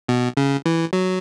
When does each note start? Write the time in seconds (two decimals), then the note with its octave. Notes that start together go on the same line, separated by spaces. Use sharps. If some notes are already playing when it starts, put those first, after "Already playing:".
0.09 B2
0.37 C#3
0.66 E3
0.93 F#3